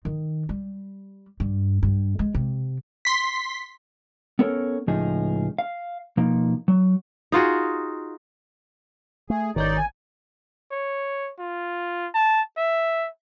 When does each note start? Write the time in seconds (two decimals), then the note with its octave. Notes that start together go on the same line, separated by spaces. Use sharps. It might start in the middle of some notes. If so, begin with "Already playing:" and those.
0.05 D#3
0.49 G3
1.40 G2
1.83 G2
2.19 G#3
2.35 C3
3.05 C6 B6
4.39 B3 C#4 A4 A#4 C#5
4.88 C#2 A2 F3 D#4 G#4
5.59 F5
6.17 B2 F3 A#3 D#4
6.68 F#3
7.32 D#4 F4 F#4 G#4
9.30 A3 G#4
9.56 G#1 D#3 D#4 C#5 D5 G6
9.77 G#5
10.71 C#5
11.39 F4
12.14 A5
12.58 E5